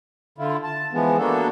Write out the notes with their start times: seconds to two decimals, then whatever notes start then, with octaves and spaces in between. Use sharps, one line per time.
0.38 D3 E4 F4
0.64 A5
0.93 E3 F3 G#3 B3
1.18 A#3 B3 D4 F#4 A4